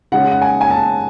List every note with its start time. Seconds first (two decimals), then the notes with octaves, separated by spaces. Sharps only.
0.12 C#3 G#3 C#4 F#5
0.31 F#5
0.42 G#5
0.61 G#5
0.71 A5